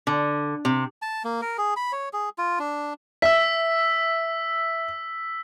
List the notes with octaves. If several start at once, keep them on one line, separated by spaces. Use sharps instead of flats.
D3
C3
A5
A#3
A#4
G#4
B5
C#5
G#4
F4
D4
E5 E6 B6